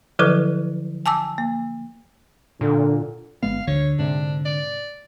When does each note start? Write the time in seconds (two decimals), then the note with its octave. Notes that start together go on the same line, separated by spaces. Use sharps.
0.19 D3 F3 F#3 E4 A4 B4
1.06 G#5 A5 D6 E6
1.38 A#3
2.61 A#2 D3
3.43 G1 G#3 B3 F5
3.67 D2 D3 C#5
3.99 G#2 C3 D4
4.45 D5